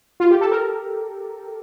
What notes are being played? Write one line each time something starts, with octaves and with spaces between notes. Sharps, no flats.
F4
G4
A4
A#4